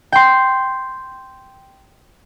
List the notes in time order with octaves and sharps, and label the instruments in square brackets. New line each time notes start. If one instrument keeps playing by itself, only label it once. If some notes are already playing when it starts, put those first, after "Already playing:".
[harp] G5 C6